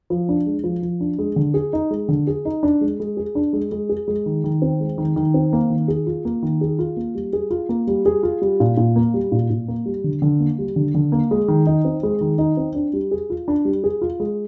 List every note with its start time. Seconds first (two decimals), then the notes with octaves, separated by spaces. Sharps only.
0.10 F3
0.29 D4
0.46 G#3
0.64 F3
0.83 F3
1.00 D4
1.19 G#3
1.36 D3
1.54 G#4
1.73 D#4
1.91 G#3
2.09 D3
2.27 G#4
2.45 D#4
2.63 D4
2.81 G#3
3.00 G#3
3.17 G#4
3.35 D4
3.53 G#3
3.72 G#3
3.89 G#4
4.08 G#3
4.26 D#3
4.44 D#3
4.62 C4
4.80 G#3
4.98 D#3
5.16 D#3
5.34 C4
5.53 A#3
5.70 D#3
5.88 G#4
6.06 F4
6.25 A#3
6.43 D#3
6.61 G#4
6.79 F4
6.97 A#3
7.15 G3
7.33 G#4
7.50 F4
7.69 A#3
7.87 G3
8.06 G#4
8.23 F4
8.41 G3
8.60 A#2
8.77 A#2
8.96 A#3
9.14 G3
9.32 A#2
9.50 A#2
9.68 A#3
9.85 G3
10.04 D3
10.22 D3
10.40 A#3
10.58 G3
10.76 D3
10.95 D3
11.12 A#3
11.31 G#3
11.48 D#3
11.67 D#4
11.85 C4
12.03 G#3
12.21 D#3
12.38 D#4
12.57 C4
12.75 D4
12.93 G3
13.11 G#4
13.30 F4
13.48 D4
13.65 G3
13.84 G#4
14.01 F4
14.20 G#3